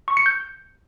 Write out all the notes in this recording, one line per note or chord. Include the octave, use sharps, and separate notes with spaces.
C#6
C#7
G6